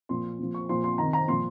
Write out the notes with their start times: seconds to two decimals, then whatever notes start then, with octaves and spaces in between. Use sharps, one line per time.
0.09 A#2 F3 C6
0.39 A#2 F3
0.55 C#6
0.69 A#2 F3 C6
0.84 C6
0.98 C3 D#3 A#5
1.13 A#5
1.28 A#2 F3 C6